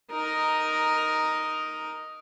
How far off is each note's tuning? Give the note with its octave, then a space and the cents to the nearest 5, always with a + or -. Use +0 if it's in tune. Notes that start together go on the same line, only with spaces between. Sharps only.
D#4 +0 A#4 +5